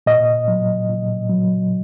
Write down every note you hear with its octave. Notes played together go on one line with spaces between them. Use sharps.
A#2 D#5
F#3
A#2
F#3